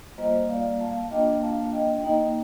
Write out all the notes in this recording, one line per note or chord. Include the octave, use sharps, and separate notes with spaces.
G3 A#3 F4 C5 D#5
D5 F5
F5 A5
A#3 D4 F4 D#5 G5
F5 A5
D#5 G5
A#3 D#4 D#5 G5